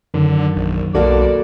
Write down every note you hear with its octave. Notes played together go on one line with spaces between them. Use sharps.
F#2 D3 D#3 F#3
A#1
B1 A#3 F#4 A4 D5